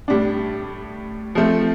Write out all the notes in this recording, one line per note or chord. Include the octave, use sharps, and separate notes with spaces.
A2 G3 D4
F3 A3 C4